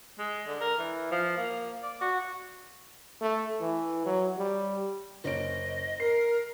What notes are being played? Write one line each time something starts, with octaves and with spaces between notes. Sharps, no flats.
G#3
D3
A#4
E3
F3
A#3
D5
F#4
A3
E3
F#3
G3
F#1 C#4 D#5 D7
A#4 C7